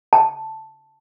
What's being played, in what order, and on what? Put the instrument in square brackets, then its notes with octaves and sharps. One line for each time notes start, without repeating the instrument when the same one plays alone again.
[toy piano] A5